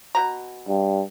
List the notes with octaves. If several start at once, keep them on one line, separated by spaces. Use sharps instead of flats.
B2 A#5
G2